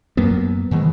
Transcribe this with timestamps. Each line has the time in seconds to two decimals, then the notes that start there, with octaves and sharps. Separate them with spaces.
0.17 F#2 F#3 A#3 B3
0.71 G#2 D#3 E3 G#3